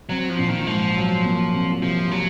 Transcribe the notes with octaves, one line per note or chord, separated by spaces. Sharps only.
F#3 C4
F3
A#1
D#3
G#2 F3
F#3
A#3
C2
C3 F3
F3 F#3